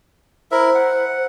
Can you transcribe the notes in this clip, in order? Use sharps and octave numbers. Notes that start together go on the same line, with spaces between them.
E4 A#4 C5 E5
F#5